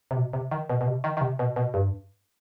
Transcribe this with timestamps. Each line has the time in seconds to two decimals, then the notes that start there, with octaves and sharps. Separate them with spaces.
0.11 C3
0.17 B2
0.33 C3
0.51 D#3
0.70 B2
0.81 B2
0.87 C3
1.04 D#3
1.17 D#3
1.21 C3
1.39 B2
1.56 B2
1.74 G2